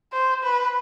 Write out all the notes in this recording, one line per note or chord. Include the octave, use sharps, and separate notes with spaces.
C5
B4